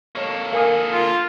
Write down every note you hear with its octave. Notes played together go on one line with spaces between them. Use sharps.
A#3 A4 C#5 D#5 C#6
A#4 F5 G#5 D#6
F4